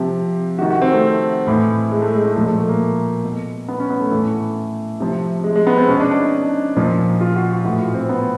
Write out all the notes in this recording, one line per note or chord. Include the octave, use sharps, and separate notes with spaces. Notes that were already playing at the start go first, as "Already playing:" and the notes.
Already playing: C3 F3 G4
C3 D#3 F#4
F#4
C4
A3
A2 E3
G#3
A3
G#3
A3
A#2 F3 A3
A3
A3
A#3
B2
B3
C#4
B3
A3
A2 E3 A3
C3 F3
G#3
G#3
B3
C4
B2 C#4
D4
D4
D#4
A#2 F3
F4
F#4
F#4
A2 E3 F#4
F4
C4
B3